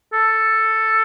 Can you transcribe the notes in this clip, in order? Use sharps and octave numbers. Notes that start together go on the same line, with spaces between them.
A4